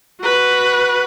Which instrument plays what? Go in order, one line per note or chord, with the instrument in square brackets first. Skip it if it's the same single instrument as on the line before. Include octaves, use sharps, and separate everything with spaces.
[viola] F#4 B4